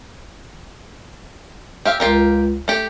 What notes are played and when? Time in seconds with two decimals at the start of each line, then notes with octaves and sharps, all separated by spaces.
1.85 G4 E5 F5
2.00 C#2 F4 G4 A#4
2.68 A3 G4